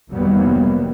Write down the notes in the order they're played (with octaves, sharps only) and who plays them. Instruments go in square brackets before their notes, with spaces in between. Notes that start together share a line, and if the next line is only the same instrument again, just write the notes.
[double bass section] F1 D#3 F#3 G3 A#3 B3